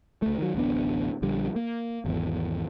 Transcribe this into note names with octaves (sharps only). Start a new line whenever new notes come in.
C#2 A3
D#3 F#3
D1 A1 B3 D4
A#1 D3 G3
A#3
G#1 E2